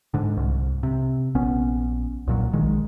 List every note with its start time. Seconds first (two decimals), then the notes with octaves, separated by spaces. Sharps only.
0.14 G#2 D3
0.37 C2
0.83 C3
1.35 A#1 B3 C#4
2.27 B1 A#2 F#3
2.53 A#1 D#3 G#3